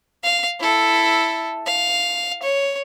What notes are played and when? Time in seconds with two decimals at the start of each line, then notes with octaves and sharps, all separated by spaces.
0.23 F5
0.60 E4 A4
1.66 F5
2.43 C#5